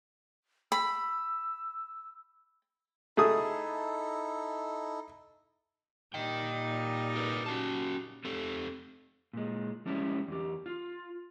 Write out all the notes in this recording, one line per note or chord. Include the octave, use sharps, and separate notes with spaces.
B5 E6
A3 D#4 E4 G#4 A4 D#6
A#2 G3 D#4 D#5 G5
G4 A#4 B4
C#4 F#4 A5
C4 G4 A4
A#2 G#3
F3 G3 G#3 C#4 E4 G4
E2 G4
F4